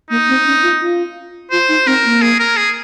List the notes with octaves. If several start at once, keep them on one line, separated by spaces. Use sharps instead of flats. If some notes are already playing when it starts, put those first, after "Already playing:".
A#3 D#4
C4
C#4
F4
F4
F4 C5
D#4
C4 A#4
A#3
G#4
A#4
G#4